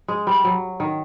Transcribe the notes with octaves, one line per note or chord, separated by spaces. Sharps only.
G#3
G3
F#3
D#3